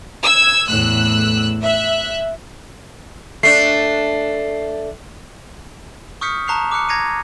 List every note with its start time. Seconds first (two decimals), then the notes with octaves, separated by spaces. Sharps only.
0.23 E6 G#6
0.66 E2 A2 E6 F#6
1.61 E5 F#6
3.43 A3 D4 C7
6.21 C#6 D#6 F6 G6 B6 C#7
6.48 A5 A#5 C#6 F#6 C7 F7
6.71 D6 F6 F#6 C#7
6.89 A#5 G#6 A#6 C7 C#7 D#7